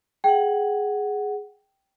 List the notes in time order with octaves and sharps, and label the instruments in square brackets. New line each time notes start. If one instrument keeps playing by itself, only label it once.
[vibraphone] G#4 F#5 [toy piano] G5